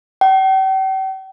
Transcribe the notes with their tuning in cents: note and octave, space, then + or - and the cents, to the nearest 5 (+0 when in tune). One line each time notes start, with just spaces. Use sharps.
G5 -40